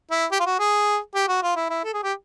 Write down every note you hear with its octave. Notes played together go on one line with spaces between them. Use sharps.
E4
G4
F4
F#4
G#4
G4
F#4
F4
E4
E4
A4
G#4
G4